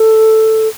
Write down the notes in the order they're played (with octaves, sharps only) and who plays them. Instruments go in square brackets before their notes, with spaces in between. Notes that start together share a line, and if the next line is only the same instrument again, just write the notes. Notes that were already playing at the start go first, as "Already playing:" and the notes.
Already playing: [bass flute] A4